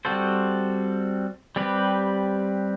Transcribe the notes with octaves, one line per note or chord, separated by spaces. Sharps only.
G3 C4 F#4 A4 C5
G3 C4 G4 B4